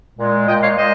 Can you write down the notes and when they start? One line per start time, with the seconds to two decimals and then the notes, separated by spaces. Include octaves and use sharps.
0.18 A#2 G#3
0.47 A#2 G#3 D#5 G5
0.61 C#5 F5
0.76 A#2 G#3 C5 D#5